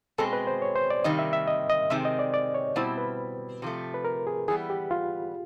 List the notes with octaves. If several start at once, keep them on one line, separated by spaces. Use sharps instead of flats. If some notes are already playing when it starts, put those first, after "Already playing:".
B2 G#3 C4 A4
B4
C5
C#5
C5
D5
C3 D#3 G3 A#3 D#5
E5
E5
D#5
D#5
C3 D#3 G#3 C4 E5
D#5
D5
D5
C#5
B2 G3 C4 E4 C5
B4
C3 F3 A3
B4
A#4
G#4
E3 G3 B3 G#4
G4
F4